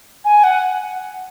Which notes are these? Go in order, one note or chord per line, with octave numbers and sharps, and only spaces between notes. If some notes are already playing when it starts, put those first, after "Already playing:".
G#5
F#5